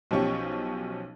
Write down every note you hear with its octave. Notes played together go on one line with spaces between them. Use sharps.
B1 F3 C#4 G4 C#6